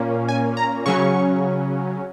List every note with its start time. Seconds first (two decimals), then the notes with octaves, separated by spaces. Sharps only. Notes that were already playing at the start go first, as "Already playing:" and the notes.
Already playing: A#2 A#3 C#4
0.29 G#5
0.57 A#5
0.86 C#3 F#3 C#4 C#6